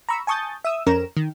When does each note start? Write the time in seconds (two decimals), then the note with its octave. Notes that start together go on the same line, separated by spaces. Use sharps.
0.09 A#5 B5 C#6 E6
0.27 G#5 A5 C#6 D#6 G6 A6
0.65 E5 D#6 E6
0.86 F2 C#4 A#4 A#5 E7
1.17 D#3